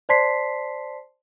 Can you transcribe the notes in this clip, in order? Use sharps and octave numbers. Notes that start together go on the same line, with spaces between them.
C5 D5 A5 C6 B6 C7